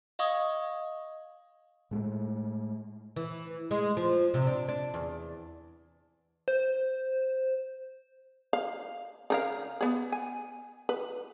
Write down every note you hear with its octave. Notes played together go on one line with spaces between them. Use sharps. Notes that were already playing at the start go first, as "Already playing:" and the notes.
D#5 F5 C#6 D#6
A2 G#3 A3
E3
G#3
F3
C3
D4
D4
E2
C5
F5
C#3 A#4 F5
B3 G#4
G#5
B4